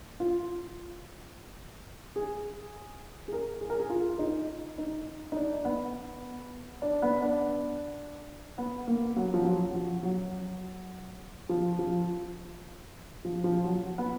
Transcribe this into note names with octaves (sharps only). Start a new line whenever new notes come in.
F4
G#4
G#4
A#4
G#4
A#4
G#4
F4
D#4
D#4
D#4
D4
B3
D4
B3
D4
B3
A#3
F#3
F3
F#3
F3
F#3
F3
F3
F3
F3
F#3
B3